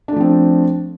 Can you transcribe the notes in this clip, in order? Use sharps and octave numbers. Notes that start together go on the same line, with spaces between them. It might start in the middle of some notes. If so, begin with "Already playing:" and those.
F3 A3 C4 D4